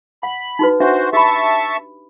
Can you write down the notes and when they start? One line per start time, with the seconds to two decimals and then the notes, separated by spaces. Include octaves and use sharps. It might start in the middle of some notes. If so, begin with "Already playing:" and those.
0.23 F#5 B5
0.59 D#4 F#4 B4
0.80 D4 F#4 C5 E5
1.13 G4 E5 A5 B5 C#6